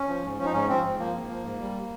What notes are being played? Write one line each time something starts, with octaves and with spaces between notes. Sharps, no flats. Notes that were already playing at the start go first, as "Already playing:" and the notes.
Already playing: C#4
F3
G#2
F3 C#4
D#4
G#2 C#4
F3 C4
G#2
F3 A#3
G#2
F3
G#2
G3